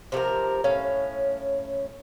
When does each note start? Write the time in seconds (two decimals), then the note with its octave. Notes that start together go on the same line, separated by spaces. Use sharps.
0.12 C3 F3 G4 A#4
0.64 A2 C#4 F5